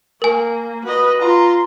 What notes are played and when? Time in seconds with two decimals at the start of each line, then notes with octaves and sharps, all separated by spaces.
0.22 A#3 A#4 G#5
0.84 F#4 B4 D#5
1.21 F4 A#5 C6